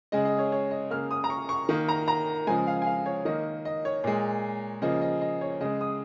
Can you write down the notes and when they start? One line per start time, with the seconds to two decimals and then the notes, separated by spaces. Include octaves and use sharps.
0.12 C#3 G#3 D#5
0.25 D#5
0.39 C#5
0.52 C#5
0.71 D#5
0.91 C#3 A#3 F6
1.11 D#6
1.24 A#5
1.30 C#6
1.49 C#6
1.69 D#3 A#3
1.89 A#5
2.08 A#5
2.47 C#3 F3 G#3 G#5
2.67 F5
2.82 G#5
2.86 F5
3.06 C#5
3.25 D#3 A#3 D#5
3.65 D#5
3.85 C#5
4.04 A#2 G#3
4.82 C#3 F3 A#3 D#5
5.02 D#5
5.21 D#5
5.41 C#5
5.61 C#3 G#3 D#5
5.81 D#6